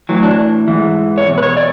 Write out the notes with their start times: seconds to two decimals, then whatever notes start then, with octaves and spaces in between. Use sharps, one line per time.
0.09 A2 E3 F#3
0.23 D4
0.68 G#2 E3
1.18 C#5
1.27 E2 B2
1.38 B4
1.43 C#5
1.57 D5